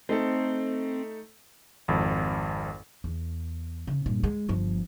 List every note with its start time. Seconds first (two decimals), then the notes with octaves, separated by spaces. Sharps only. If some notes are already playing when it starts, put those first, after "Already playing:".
0.09 A3 C4 D#4 A4
1.88 G#1 F2
3.04 E2
3.87 C#3
4.06 G2 A#2
4.23 G#3
4.48 G1 F3